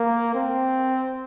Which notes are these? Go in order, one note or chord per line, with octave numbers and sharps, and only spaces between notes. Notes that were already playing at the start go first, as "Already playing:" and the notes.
Already playing: A#3
C4